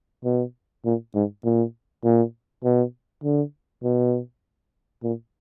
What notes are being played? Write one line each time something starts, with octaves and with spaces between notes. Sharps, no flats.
B2
A#2
G#2
A#2
A#2
B2
D3
B2
A#2